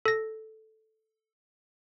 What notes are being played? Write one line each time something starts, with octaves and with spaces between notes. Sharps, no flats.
A4 A#6